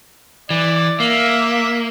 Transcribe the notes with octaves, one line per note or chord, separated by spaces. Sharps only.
E3 D5
A#3 E5